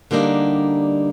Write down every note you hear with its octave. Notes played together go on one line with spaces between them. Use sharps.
D3 G3 A#3 D4 D#4